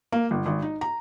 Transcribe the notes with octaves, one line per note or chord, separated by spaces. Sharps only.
A#3
G1
G#1
D#4
A#5